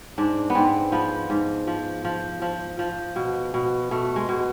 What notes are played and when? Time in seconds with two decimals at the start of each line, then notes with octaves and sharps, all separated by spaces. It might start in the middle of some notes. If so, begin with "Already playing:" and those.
0.18 G#2 D4
0.50 B3
0.55 G#2 C4
0.92 F3 B3
1.30 G#2
1.67 F3
2.05 F3
2.42 F3
2.79 F3
3.16 B2
3.54 B2
3.91 B2 A3
4.16 G#3
4.29 B2